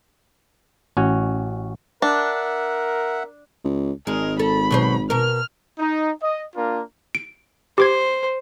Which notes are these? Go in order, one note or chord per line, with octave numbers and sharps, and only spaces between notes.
A1 C#4 F#4 C#5
D4 A#4 E5 F#5
C#2
G#1 G#3 A#4
A4 B5
B2 F#3 C5
B2 A#4 F6
D#4
D#5
A#3 D4 F4 A#4
D7
G4 C5 D6 G#6